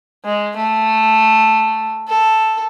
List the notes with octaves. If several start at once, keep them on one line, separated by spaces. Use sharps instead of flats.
G#3
A3
A4